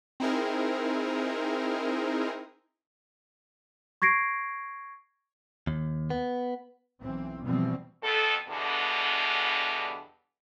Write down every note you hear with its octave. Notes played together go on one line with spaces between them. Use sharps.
C4 D#4 E4 G#4 A#4
C#6 G#6 A#6 C7 D7
D#2
B3
B1 E3 C4
B2 E3 F3 G3 C4
F2 B2 A4
E2 G2 B2 D3